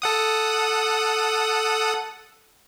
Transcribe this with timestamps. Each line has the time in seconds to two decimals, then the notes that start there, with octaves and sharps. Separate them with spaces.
0.02 A4 F#5 D#6